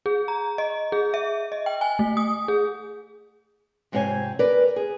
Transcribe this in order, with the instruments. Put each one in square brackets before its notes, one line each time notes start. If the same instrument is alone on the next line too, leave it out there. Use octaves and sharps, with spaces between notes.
[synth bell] G#4
A#5
D#5
G#4
E5
D#5
G5
G#5
A3
D#6
G#4
[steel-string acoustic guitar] F2 G#2 C3 C4 C#5 G#5
A#4 B4 D5
G#4